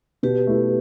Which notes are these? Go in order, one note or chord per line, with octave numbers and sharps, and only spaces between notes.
B2 G4 B4
A3 E4